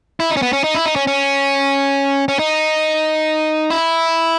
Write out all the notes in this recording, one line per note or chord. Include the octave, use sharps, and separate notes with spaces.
E4
D#4
C#4
B3
C#4
D#4
E4
D#4
C#4
C#4
C#4
D#4
E4